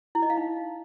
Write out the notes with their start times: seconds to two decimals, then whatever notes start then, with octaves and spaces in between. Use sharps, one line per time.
0.15 E4
0.22 D#5
0.30 F5
0.37 D#4